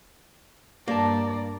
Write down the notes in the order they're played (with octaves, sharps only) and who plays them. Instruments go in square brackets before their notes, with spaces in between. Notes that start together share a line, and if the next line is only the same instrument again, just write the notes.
[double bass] G2 [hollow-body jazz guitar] A#3 [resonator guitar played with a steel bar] G4 B4 A5 [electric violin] D5 A#5